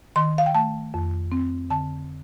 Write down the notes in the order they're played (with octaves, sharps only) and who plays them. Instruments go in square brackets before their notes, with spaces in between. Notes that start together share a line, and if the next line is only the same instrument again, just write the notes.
[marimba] D#3 C6
F5
G5
A3 A5
F2
C4
D3 A5